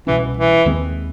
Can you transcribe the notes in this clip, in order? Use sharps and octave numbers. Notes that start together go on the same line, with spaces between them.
C2 B2 E3 G#3 C#4
E3
D#2 D#3 G#3 C4